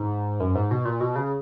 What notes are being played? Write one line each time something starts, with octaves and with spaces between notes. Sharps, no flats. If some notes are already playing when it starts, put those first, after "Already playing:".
Already playing: G#2
F#2
G#2
B2
A#2
B2
C#3